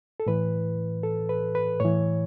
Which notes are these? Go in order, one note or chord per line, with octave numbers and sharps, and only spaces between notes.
A4
A2 E3 B4
A4
B4
B4
A2 E3 C#5